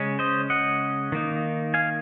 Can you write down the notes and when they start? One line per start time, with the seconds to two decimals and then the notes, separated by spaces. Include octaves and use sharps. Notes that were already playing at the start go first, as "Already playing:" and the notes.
Already playing: C#3 G#3 C#4
0.19 C5 D#5
0.50 D#5 F#5
1.12 D#3 A#3 D#4
1.74 F5 G#5